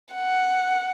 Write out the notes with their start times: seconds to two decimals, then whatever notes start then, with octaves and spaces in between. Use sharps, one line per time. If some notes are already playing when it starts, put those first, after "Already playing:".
0.14 F#5